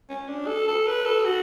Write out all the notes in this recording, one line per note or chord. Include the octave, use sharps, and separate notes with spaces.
C#4
D4
A4
A4
B4
A4
F#4